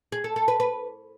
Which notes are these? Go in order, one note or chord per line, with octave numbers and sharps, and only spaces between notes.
G#4
A4
A4
B4
B4